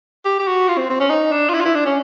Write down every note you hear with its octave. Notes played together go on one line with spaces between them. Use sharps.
G4
G4
F#4
F4
C4
C4
C#4
D#4
D4
F4
E4
F4
E4
D4
C#4